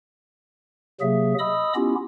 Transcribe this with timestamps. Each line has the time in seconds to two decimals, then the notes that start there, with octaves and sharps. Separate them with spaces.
1.01 C3 F#3 A#3 G#4 E5
1.39 D#5 B5 D#6 E6
1.75 B3 C#4 E4 F4 G4